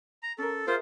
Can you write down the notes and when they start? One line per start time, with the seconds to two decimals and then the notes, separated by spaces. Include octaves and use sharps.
0.23 A#5
0.38 C#4 A4 A#4
0.67 F4 G#4 A#4 C5 E5